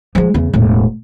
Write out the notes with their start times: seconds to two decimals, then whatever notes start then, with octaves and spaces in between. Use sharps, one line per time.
0.15 F3 G#3
0.34 E2 C#3
0.53 E1 A2